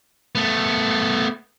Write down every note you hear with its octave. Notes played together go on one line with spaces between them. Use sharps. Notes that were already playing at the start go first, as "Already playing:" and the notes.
A3 B3